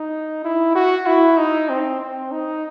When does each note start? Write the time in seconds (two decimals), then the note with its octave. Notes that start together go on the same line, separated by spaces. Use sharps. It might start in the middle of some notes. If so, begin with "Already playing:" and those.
Already playing: D#4
0.44 E4
0.75 F#4
1.06 E4
1.38 D#4
1.70 C4
2.00 C4
2.32 D#4